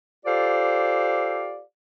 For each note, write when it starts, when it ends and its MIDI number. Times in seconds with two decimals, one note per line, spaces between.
0.25 1.61 65
0.25 1.61 67
0.25 1.61 69
0.25 1.61 72
0.25 1.61 74
0.25 1.61 77